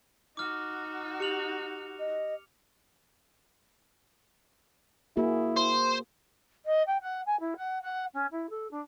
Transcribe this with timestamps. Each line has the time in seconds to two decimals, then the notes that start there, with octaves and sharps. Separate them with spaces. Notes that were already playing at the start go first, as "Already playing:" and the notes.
0.37 D#4 F#4 D6 F6
1.20 G4 C#7 F7 F#7
1.99 D#5
5.17 A#3 E4 F#4 G#4
5.57 C5
6.65 D#5
6.87 G5
7.01 F#5
7.26 G#5
7.40 E4
7.56 F#5
7.82 F#5
8.14 C#4
8.31 E4
8.49 A4
8.71 D4